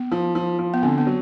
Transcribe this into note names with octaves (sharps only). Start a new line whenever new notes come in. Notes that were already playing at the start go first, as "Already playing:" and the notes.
Already playing: B3
F3
F3
F3
B3
D3 C4
B3
F#3